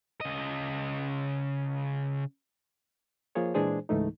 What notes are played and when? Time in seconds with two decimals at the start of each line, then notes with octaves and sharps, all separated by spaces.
0.21 C#3 D#5
3.35 F3 A#3 F4 G#4 C#5
3.54 A#2 E3 G#3 D4 G#4 C5
3.89 C#2 G#2 E3 A3 D#4